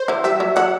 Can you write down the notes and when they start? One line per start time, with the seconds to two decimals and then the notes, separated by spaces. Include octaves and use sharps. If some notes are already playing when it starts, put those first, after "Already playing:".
Already playing: C5
0.08 E3 E4
0.24 G3 E5
0.40 F#3
0.56 F#3 F#5